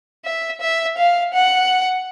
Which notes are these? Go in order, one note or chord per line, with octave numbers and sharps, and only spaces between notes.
E5
E5
F5
F#5